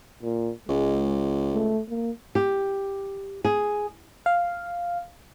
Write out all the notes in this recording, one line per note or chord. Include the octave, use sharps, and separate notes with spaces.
A#2
C#2 G#3
A3
A#3
G4
G#4
F5